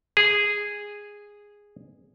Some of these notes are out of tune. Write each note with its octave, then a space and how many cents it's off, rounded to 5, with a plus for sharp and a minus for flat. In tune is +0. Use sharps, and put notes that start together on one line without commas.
G#4 -10